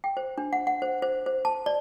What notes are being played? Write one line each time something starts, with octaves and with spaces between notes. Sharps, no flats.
G5
C5
D4
F#5
F#5
C5
C5
C5
A5
D5